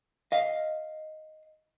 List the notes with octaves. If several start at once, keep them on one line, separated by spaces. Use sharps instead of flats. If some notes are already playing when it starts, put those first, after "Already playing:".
D#5 F5